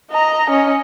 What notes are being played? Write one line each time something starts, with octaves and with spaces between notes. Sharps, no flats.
D#5 A#5
C#4 D#5